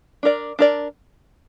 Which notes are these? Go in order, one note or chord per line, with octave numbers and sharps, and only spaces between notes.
D4 A#4 D5
D4 A#4 D5